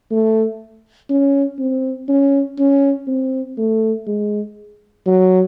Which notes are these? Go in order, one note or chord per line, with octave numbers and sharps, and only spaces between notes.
A3
C#4
C4
C#4
C#4
C4
A3
G#3
F#3